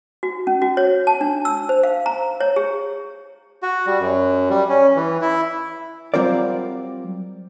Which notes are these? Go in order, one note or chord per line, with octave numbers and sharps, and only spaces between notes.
F#4
C#4
F#4
C#5
A5
D4
E6
C5
F5
A#5
C#5
G#4
F#4
G3
F#2
G3
C#4
E3
E4
F#3 G3 C4 F4 A#4 D5